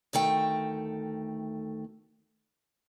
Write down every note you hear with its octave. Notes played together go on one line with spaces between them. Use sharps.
D2 D#3 A3 G5